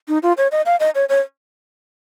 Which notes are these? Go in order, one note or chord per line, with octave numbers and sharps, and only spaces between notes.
D#4
F4
C#5
D#5
F5
D#5
C#5
C#5